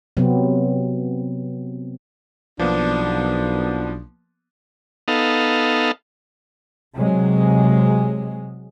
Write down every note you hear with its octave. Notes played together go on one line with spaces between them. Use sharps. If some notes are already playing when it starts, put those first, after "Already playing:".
C3 F#3 B3 C4
B1 F3 A#3 B3 D4
B3 D#4 A4 F5
C3 F#3 G#3